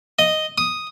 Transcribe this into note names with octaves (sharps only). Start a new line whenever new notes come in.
D#5
D#6